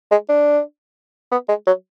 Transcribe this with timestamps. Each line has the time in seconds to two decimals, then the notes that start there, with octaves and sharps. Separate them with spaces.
0.11 G#3
0.29 D4
1.32 B3
1.48 G#3
1.67 F#3